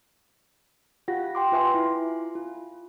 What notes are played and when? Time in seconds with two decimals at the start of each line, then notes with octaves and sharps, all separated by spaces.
1.08 F4 G4 F#5 A#6
1.35 G5 C6 D6
1.52 F4 B4 E5 G#5 C6
1.74 E4
2.35 F4